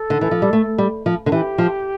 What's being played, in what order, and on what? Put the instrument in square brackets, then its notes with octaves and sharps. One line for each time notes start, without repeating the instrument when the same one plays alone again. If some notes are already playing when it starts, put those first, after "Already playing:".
Already playing: [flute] A4
[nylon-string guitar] D3
E3
F3
G3
A3
G3
F3
D3
[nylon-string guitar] E3 [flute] G4
[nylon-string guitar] F3